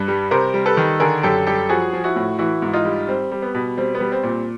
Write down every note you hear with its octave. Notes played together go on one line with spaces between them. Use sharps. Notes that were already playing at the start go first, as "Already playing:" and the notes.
Already playing: G2 B4
G3
C3 A#4 C5
G3
A4 B4
D#3
D3 G#4 A#4
F#2 G4 A4
G3 G4 A4
F3 F#4 G#4
F3
E4 F#4
A2
E3 E4 F#4
G#2
D#4 F4
G3
G3 C4
G3
B3
B2
G3 C4
B3
G3
C4
A#2
C4